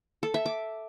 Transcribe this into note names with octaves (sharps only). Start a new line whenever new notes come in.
A4
E5
D6